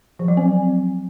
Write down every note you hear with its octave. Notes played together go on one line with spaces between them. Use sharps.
F3
F#3
C4